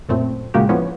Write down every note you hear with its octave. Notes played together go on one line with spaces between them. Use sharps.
F#2 A#2 A3 C4
A#2 C#3 G#3 A#3 F#4 G4
D#2 A2 F3 B3 C#4